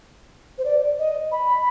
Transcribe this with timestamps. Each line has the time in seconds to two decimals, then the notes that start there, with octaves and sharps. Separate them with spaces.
0.58 C5
0.65 D5
0.99 D#5
1.32 B5